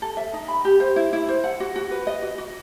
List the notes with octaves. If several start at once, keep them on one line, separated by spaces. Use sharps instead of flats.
A4
E5
D#4
B5
G4
C5
E4
E4
C5
F#5
F#4
F#4
B4
D#5
F#4
F#4